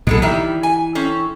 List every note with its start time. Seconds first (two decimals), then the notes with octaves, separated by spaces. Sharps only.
0.07 B1 A#2 G#3 B3 A4
0.22 D#3 E3 G3 E5
0.63 G#5
0.95 C4 C#4 A4